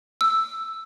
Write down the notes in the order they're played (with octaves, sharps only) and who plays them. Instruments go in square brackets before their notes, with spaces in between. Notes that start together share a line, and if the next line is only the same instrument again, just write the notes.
[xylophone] E6